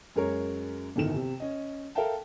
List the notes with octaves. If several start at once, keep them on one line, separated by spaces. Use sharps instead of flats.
F#2 G#3 A#4 C#5
D1 G1 D#3 E7
C3
C#4 D#5
A4 A#4 E5 F5 G5 A5